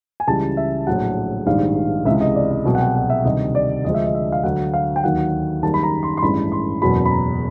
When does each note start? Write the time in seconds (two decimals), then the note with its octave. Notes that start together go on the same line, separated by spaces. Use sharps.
0.20 G#5
0.27 C#2 C#3 E3 G3 A5
0.57 E5
0.87 A#1 A2 F#3 F#5
1.46 A#1 G#2 D#3 G3 F5
2.05 C#2 C3 E3 G#3 E5
2.21 D#5
2.35 D5
2.51 D#5
2.65 C2 B2 F#3
2.75 F#5
2.80 G5
2.95 F#5
3.10 E5
3.25 D2 C3 D#3 G3 D#5
3.55 D5
3.85 D2 D3 F3 G#3 D#5
3.94 E5
4.04 D#5
4.15 E5
4.32 F5
4.43 D2 D3 F#3 F#5
4.74 F5
4.96 G5
5.03 D#2 D#3 F#3 F#5
5.63 F#1 F#2 D#3 G3 A5
5.74 B5
5.83 A#5
6.03 C6
6.17 C6
6.22 A1 G2 E3 G#3 B5
6.52 C6
6.82 F#1 E2 B2 F#3 B5
7.05 B5
7.11 A#5